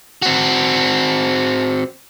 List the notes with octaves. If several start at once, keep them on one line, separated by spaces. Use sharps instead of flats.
C4 F#4